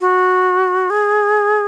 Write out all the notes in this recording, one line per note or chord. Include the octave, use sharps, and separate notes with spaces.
F#4
G#4